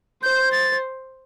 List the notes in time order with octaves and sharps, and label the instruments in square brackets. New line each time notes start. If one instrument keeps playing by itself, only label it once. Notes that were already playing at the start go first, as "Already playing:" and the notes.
[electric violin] C5 [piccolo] G6
[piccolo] A6